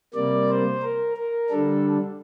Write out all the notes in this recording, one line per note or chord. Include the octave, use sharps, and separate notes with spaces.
C3 G3 A#3 D5
C5
A#4
A#4
D3 G3 D4 A4